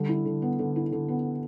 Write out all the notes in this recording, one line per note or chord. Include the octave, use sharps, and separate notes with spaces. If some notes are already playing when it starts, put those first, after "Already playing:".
Already playing: D3 G3
E4
D3
B3
D3
E4
D3
B3